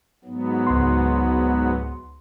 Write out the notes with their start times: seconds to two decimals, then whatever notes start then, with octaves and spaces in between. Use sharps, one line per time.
0.24 G#2 F#3 B3
0.67 C#2 C6